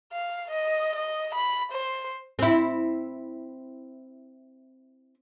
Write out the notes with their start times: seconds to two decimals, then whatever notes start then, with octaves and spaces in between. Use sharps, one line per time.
0.12 F5
0.51 D#5
0.95 D#5
1.35 B5
1.72 C5
2.39 C4 E4